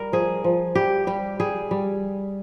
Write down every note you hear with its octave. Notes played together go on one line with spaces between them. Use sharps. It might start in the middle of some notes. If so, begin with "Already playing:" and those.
Already playing: G3 A#4
F3 G#4
F3
G3 G4
G3 G4
G3 G#4
G3